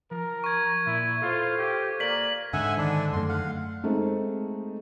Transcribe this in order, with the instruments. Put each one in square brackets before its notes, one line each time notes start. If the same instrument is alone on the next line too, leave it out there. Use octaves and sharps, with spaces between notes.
[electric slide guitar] F3 [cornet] A#4
[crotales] C#6 G#6
[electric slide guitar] A#2 [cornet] E4
[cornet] F4 [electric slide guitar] A4 C5
[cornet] G4
[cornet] A#3 [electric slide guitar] A#4 D5 [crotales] B6 F#7
[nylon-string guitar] G#2 D3 [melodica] E5 F#5 G#5
[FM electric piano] D#3 [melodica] D4
[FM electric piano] F#2 A3 [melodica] C6
[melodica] F5 F#5
[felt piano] G#3 A3 C4 D#4